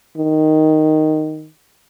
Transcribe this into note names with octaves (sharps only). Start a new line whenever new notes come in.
D#3